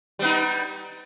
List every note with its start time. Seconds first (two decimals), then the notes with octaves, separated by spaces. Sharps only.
0.19 G3
0.22 B3
0.24 D#4